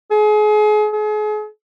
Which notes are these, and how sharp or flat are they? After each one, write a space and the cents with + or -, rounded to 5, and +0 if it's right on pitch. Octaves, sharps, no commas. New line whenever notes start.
G#4 +35
G#4 +40